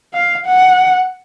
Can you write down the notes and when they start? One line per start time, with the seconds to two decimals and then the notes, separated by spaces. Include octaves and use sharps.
0.14 F5
0.46 F#5